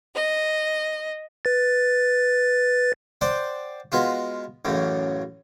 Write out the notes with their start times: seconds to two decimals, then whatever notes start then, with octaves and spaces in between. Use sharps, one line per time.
0.15 D#5
1.45 B4 A6
3.21 C5 D5 F#5 G5
3.92 G#3 B3 F4 F#4
4.65 A1 F#2 C#3